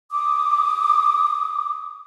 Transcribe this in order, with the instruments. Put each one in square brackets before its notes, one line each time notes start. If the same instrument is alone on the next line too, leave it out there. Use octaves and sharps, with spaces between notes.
[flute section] D6 D#6